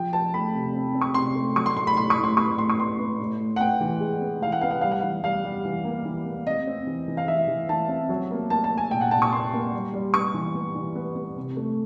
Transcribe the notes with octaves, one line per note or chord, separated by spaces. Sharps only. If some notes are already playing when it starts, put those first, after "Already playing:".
Already playing: F3 G5
F3 A5
A3 B5
C3
C4
C4
C#6
C3 C6
A3
F#3 C#6
C6
A2 C6
B5
A2 C6
C#6
A2
C6
B3 C#6
A2 C6
C#6
B3 C6
B3
A2
A2
F#5
B3 G5
E3
G#3
B3
E3 F5
F#5
B3 F5
F#5
G3 F5
F#5
E3 F5
G3 F5
G3
E3
A#3
E3
A#3
C4 D#5
C4
E3
E3
F5
E3 E5
E3
E3 A5
C4
F#3
A#3
A#3 A5
A5
A#3
G#5
A#2 G5
F#5
A#2 A5
C#6
A#3 C6
A#3
G3
G3
B3 C#6
E3
B3
E3
B3
B3
C3
A3